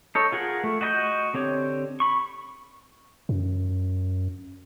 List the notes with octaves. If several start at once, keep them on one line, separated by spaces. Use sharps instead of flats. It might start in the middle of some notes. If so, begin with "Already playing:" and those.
D#4 A4 C#5
F4 G#4 A#4 F#5
A3
F#4 D#5 A#5 G6
D3 C4 G4 C#5
B5 C#6
F#2